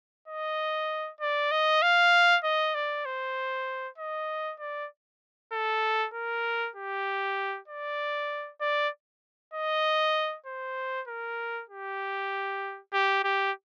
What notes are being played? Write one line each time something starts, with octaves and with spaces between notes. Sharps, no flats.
D#5
D5
D#5
F5
D#5
D5
C5
D#5
D5
A4
A#4
G4
D5
D5
D#5
C5
A#4
G4
G4
G4